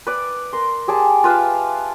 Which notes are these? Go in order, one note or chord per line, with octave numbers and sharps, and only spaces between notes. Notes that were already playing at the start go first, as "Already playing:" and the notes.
B4 D5
A#4 C6
G4 G#4 D5 A5
F4 B4 E5 F5